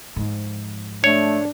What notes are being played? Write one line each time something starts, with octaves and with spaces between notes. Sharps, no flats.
G#2 F3
A3 D4 C#5